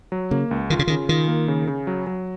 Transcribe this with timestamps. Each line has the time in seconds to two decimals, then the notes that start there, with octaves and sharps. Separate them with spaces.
0.12 F#3
0.31 C#3 A#3
0.51 C#2
0.70 D#3 F4
0.79 C#3
0.87 D#3
0.90 C#3
1.09 D#3 F4
1.28 A#3
1.48 C#3
1.67 C#3
1.87 F#3
2.07 F#3